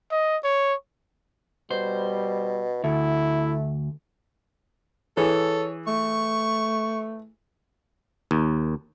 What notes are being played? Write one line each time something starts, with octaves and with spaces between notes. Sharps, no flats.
D#5
C#5
B2 G3 C5
D2 A3 E4
E3 G#4 A4 C#5
A3 C#6
D#2